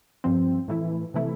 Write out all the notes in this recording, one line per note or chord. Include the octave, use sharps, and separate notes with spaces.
G2 F3 C4
A2 E3 A3 E4
C3 E3 A3 E4